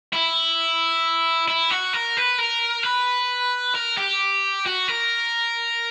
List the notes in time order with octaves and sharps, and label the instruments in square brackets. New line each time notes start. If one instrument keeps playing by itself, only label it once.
[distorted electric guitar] E4
E4
F#4
A#4
B4
A#4
B4
A#4
G4
F#4
A#4